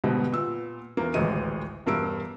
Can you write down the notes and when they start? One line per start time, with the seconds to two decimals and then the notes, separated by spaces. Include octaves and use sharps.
0.04 G#2 B2 D3 F#3 G3
0.32 A#2 B3 E6
0.97 E2 A#3
1.14 D#1 A1 D2 G#3 D#5 D#7
1.86 E1 G2 A#3 E6 D7